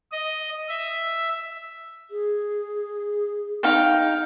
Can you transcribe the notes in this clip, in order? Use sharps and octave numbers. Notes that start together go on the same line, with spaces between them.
D#5
E5
G#4
D#4 F5 G5